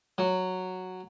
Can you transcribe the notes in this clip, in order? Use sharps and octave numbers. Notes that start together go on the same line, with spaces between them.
F#3